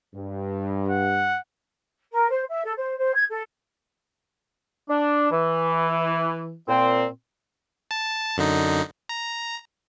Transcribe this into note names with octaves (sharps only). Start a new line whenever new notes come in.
G2
F#5
A#4
C5
E5
A4
C5
C5
G#6
A4
D4
E3
A#2 C4
A5
F#2 D3 D#4
A#5